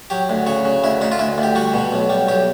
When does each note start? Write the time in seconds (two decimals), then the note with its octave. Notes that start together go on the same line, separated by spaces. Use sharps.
0.10 F#3 G4
0.30 D2
0.46 C#3 F#4
0.65 C#3
0.84 D2 E4
1.01 D2 D#4
1.12 F4
1.19 D2 E4
1.38 D2
1.43 G4
1.55 G3 F#4
1.74 B2
1.92 B1
2.10 G3
2.28 B1 G4